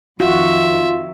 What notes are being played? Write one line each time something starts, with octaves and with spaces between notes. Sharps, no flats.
F2 D#3 F4 F#4 E5